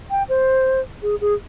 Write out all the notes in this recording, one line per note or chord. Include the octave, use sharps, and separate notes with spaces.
G5
C5
G#4
G#4